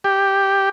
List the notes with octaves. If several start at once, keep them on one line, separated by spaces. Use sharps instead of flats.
G4